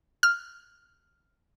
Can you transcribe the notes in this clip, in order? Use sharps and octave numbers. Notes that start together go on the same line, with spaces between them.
F6